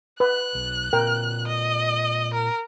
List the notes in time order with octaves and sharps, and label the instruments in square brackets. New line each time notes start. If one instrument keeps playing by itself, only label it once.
[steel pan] B4 [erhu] F#6
[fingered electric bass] B1
[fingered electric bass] A#2 C4 [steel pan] A#4 G5
[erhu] D#5
A#4